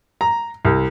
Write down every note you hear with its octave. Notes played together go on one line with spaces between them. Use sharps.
A#5
C2